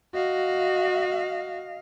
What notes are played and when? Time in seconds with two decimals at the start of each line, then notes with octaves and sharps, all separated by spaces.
0.14 F#4 D#5 F5